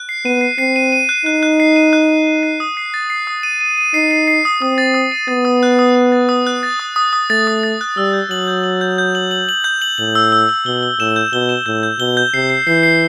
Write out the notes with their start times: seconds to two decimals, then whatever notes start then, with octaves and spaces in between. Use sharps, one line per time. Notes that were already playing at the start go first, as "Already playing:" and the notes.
Already playing: F#6
0.09 C7
0.25 B3 D#7
0.41 C7
0.58 C4 C7
0.76 D#7
0.93 D#7
1.09 F#6
1.26 D#4 F#6
1.43 F#6
1.60 C7
1.76 D#7
1.93 F#6
2.09 D#7
2.27 D#7
2.43 C7
2.60 D#6
2.77 C7
2.94 A6
3.10 C7
3.27 D#6
3.43 D#7
3.61 D#7
3.78 D#7
3.94 D#4 C7
4.11 C7
4.27 C7
4.45 D#6
4.61 C4 D#6
4.78 A6
4.94 D#6
5.12 D#7
5.28 B3 A6
5.45 D#6
5.63 F#6
5.79 D#6
5.95 D#6
6.12 A6
6.29 D#6
6.47 F#6
6.63 A6
6.80 D#6
6.96 D#6
7.13 D#6
7.30 A3 A6
7.47 D#6
7.63 A6
7.81 F#6
7.97 G3 E6
8.13 G6
8.31 F#3 F#7
8.48 G6
8.64 F#7
8.81 G6
8.98 G6
9.15 F#7
9.31 F#7
9.49 F#7
9.64 G6
9.82 F#7
9.98 A2 F#7
10.15 E6
10.32 E6
10.49 E6
10.66 B2 G7
10.83 G7
10.99 A2 E7
11.16 G6
11.33 B2 G7
11.49 E7
11.66 A2 G6
11.83 G6
12.00 B2 G7
12.17 G6
12.34 C3 C7
12.50 C7
12.67 E3 C7
12.83 C7